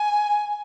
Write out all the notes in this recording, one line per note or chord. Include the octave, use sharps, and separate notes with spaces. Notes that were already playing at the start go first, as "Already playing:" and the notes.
Already playing: G#5